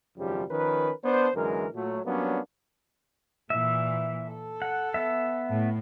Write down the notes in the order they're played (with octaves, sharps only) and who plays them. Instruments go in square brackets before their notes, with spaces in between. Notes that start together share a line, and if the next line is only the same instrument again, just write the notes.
[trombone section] G#1 F#2 C#3 F3 G3 G4
D#3 F3 C#4 A#4 B4
B3 D4 C5
F#2 D3 E3 G#3 A#4
A#2 F#3 A3
F#3 G3 A#3 B3 C#4 D4
[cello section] A#2 E3 [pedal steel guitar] E5
[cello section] A4
[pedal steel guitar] F#5
B3 E5
[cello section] A2